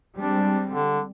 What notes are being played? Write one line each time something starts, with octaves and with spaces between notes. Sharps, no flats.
G3 G#3 C4 D4
D3